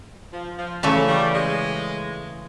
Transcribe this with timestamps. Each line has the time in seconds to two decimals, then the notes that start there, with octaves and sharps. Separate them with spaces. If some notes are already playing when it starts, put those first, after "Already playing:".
0.33 F3
0.58 F3
0.83 C#3 E3 F#3 A3
1.08 G3
1.34 G#3